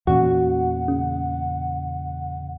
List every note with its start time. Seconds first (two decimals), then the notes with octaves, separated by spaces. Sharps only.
0.07 E2 A#2 C#4 F#4 F#5
0.88 C#3